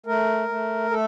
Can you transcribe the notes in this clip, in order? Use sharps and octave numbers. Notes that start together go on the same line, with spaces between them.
A3 A#4
A3
A3 A4